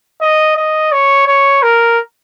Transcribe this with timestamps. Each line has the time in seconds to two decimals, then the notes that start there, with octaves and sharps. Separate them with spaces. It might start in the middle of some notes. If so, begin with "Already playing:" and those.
0.22 D#5
0.57 D#5
0.92 C#5
1.27 C#5
1.62 A#4